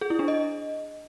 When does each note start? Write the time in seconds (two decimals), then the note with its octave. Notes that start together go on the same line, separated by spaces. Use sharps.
0.01 G#4
0.10 E4
0.19 D4
0.28 D#5